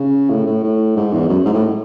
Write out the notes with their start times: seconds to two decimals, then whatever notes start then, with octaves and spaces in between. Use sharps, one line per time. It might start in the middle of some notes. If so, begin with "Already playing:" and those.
Already playing: C#3
0.30 A2
0.46 A2
0.64 A2
0.96 G#2
1.13 E2
1.29 F#2
1.45 G#2
1.53 A2